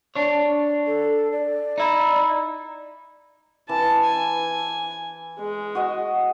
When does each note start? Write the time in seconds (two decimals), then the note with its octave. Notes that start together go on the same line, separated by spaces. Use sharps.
0.16 D4 C#5
0.87 A4
1.32 D5
1.78 D#4 E4
3.69 E3 A5
4.04 G#5
5.39 G#3
5.75 F#4 D#5